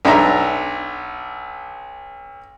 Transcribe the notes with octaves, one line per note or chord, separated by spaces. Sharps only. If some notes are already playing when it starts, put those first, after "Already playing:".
B1 D4 E5 A#5